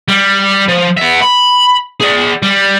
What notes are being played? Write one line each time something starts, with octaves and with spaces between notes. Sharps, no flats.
G3
F3
B3 E5
B5
G#4 D5
G3